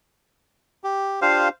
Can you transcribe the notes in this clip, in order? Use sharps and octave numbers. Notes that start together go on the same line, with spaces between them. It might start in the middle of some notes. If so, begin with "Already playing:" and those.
G4
D4 F4 G4 C5 F5